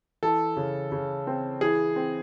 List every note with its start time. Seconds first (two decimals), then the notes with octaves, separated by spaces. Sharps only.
0.23 E3 A4
0.57 C#3
0.92 C#3
1.27 C4
1.61 E3 G#4
1.96 C4